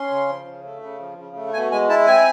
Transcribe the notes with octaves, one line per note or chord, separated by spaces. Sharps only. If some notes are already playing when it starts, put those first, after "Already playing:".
Already playing: C#4 C6
C#3
F3
C#3
A3
C#3
F3
C#3
A3
B2 G#5
G#3 G#5
E4 A5
C4 G#5